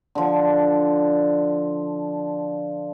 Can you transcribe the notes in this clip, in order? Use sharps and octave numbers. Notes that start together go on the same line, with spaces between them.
D3 F3